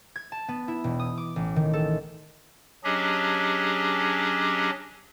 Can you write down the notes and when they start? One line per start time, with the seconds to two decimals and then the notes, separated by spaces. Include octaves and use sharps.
0.16 G#6
0.32 A5
0.48 B3
0.68 E4
0.84 E1
0.99 D#6
1.17 D6
1.36 A1
1.56 D#3
1.73 A4
2.84 F#3 C#4 D4 G4 G#4 D#5